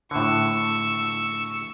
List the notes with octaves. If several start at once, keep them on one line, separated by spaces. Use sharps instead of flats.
A2 D3 C#6 E6